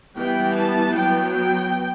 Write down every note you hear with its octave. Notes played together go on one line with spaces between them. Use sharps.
E3 G3 B3 G5
A5
F#3 B3 G5
G5